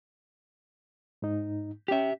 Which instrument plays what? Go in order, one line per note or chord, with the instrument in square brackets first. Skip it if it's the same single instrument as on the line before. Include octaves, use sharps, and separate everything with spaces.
[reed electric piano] G#2 D#4
[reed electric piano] C#4 G5 [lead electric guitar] G4 E5